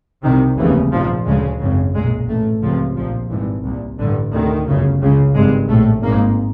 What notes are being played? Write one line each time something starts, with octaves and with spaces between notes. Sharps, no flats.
C2 C3 D#3
F1 D#2 C#3 E3
A#1 G#2 F3
D2 C#3 G#3
G#1 F#2 C#3
B1 A#2 G#3
A1 A2 A3
C#2 C3 F3
A#1 A#2 F3
G#1 G2 E3
C2 A#2
A1 G2 D3
D2 C3 D#3
G1 F#2 C#3
C#2 C#3
G#1 G2 G#3
A#1 A2 A3
G#1 G#2 A#3